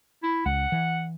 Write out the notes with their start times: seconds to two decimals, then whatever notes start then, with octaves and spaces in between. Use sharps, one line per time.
0.23 E4
0.46 C#2 F#5
0.72 E3